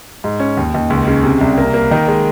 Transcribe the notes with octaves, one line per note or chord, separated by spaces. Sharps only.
G#2
C#4
D#2
D#2
C#2
C#3
C3
C2
A#3
A#3
D#3
G#3